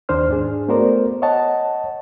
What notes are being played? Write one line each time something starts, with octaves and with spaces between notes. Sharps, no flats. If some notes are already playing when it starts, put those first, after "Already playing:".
D#2 D#3 D4 C5 F6
G#2 D4 G#4
A3 B3 F#4 A#4 C5 D5
C#5 D#5 F#5 A5